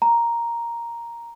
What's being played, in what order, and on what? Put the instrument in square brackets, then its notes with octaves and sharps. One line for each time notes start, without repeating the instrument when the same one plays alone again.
[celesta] A#5